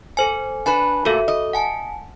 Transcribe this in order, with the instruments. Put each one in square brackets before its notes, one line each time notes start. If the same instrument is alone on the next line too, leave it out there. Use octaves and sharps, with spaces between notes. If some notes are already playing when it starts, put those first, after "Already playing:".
[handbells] A4 C5 G#5
[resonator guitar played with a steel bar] D4 B4 [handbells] G#5 B5
[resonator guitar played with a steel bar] A#2 A3 [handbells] F#4 A4
[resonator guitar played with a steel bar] D#5
[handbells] F#5 G#5 A5